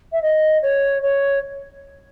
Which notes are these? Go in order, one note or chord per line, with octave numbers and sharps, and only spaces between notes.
E5
D#5
C#5
C#5